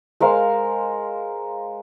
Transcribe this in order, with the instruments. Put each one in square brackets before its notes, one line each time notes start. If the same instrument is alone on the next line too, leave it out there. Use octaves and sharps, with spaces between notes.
[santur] G#3 A#4 C5 F5